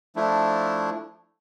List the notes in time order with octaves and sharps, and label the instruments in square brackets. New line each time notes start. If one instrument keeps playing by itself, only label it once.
[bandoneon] F3 A3 D4 E4